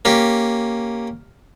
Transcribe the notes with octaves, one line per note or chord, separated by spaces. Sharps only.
A#3 C#4 G4